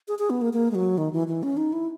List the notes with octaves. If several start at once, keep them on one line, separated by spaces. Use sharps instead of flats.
G#4
G#4
B3
A#3
A#3
G#3
F#3
D#3
E3
E3
C#4
D#4
E4